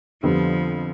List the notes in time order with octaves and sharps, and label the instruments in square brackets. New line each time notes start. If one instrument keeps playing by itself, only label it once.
[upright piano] F2 D3 G3 B3 [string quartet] F3